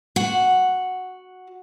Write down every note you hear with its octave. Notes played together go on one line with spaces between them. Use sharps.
F#4 F#5